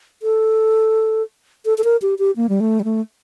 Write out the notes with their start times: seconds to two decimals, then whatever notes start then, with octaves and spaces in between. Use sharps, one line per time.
0.22 A4
1.65 A4
1.78 A4
1.84 A#4
2.02 G4
2.19 G4
2.36 A#3
2.49 G3
2.60 A3
2.80 G3
2.84 A3